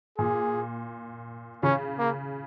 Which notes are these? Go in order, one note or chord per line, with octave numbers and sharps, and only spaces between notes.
A#2 G#4
C#3 C#4
A#3